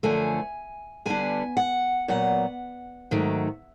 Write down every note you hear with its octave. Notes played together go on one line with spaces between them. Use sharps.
F#2 D3 F3 A3 G#5
D3 G3 B3 D4 G#5
F#5
A#2 F#3 B3 F#5
G#2 D#3 F#3 A3